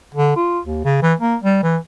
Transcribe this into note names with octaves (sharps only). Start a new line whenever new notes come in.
D3
F4
D#2
C#3
E3
A#3
G3
E3